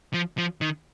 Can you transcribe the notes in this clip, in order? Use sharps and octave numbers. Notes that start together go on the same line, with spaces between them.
F3
F3
D#3